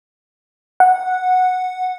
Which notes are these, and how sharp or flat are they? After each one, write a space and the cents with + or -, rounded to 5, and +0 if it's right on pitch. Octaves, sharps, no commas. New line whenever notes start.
F#5 -10